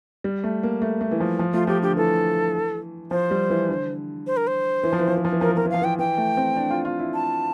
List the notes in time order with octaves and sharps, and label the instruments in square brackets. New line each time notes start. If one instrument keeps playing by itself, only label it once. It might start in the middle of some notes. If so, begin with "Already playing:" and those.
[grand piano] G3
A3
A#3
A3
A3
E3
F3
F3
[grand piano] A3 [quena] F4
[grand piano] F3 [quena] G4
[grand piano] D3 [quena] G4
[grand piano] E3 [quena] A4
[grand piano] F3 [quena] C5
[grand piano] G3
E3
D3
[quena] C5
A#4
C5
[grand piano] E3
F3
E3
F3
E3
F3
E3
[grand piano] F3 [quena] A#4
[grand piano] E3
[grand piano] F3 [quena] A#4
[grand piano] E3
[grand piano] F3 [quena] F5
[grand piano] E3 [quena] G5
[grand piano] E3 [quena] G5
[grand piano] A3
C4
D4
F4
F4
E4
[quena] A5